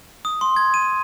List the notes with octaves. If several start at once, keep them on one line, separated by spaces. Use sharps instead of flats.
D#6
C6
G#6
D#7